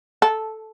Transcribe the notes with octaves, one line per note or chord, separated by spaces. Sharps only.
A4